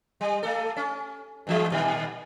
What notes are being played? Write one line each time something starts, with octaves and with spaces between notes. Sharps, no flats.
G3
A3 A4
C#4
G2 E3 G#3
A#2 D#3 G3